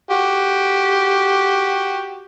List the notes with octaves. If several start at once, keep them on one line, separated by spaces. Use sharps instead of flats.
F#4 G4